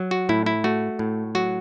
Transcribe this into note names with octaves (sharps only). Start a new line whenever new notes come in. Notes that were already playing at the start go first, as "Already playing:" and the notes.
Already playing: F#3
F#4
A2 E4
E4
A3 F#4
A2
F#3 F#4